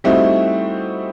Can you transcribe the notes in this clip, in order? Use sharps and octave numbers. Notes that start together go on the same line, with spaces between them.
G3 A3 C4 D#4 E4 F#4